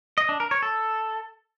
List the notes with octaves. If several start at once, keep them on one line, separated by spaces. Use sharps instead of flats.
D#5
D4
A#4
C#5
A4